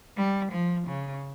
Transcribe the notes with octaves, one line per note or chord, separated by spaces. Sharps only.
G3
F3
C#3